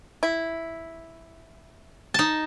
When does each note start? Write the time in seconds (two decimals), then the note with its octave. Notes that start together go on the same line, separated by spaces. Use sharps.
0.23 E4
2.14 D#4 A5